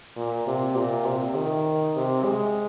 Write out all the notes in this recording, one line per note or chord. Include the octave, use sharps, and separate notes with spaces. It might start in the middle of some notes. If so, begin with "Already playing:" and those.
A#2
C3
A#2
C3
D#3
C3
G#3